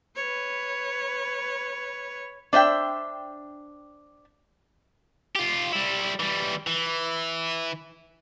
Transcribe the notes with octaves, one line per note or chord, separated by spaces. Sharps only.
B4 C#5
D4 C5 E5 G5
F4 G4
G3 E4
E3 G3
E3